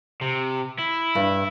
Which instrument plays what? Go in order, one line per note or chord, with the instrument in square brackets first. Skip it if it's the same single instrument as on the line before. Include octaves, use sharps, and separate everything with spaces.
[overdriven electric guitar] C3
E4
[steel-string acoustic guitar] G2